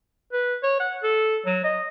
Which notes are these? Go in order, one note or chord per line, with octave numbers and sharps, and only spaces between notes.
B4
C#5
F#5
A4
F#3
D#5